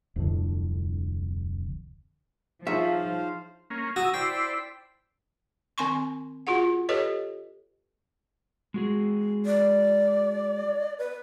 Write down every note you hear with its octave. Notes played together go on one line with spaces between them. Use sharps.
D1 C2 F2 D3
F3 D#4 G#4 C5 C#5 E5 F5
A#3 C#4
F#4 A#5 D#6 E6
E4 C5 D5 G5
D#3 C4 G#5 C6 C#6
F4 F#4 G#4 F#5
G4 A4 B4 C#5 D#5
G#3 F#4 G#4
D5
B4